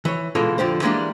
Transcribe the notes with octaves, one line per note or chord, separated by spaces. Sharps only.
E3 C#5
B2 D3 E3 G#3 F4 A4
F2 D3 G4 C5
E3 G3 G#3 A#3 C4 D4